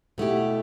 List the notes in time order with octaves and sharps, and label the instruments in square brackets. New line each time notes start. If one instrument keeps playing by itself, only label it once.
[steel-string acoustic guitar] B2 A3 E4 G4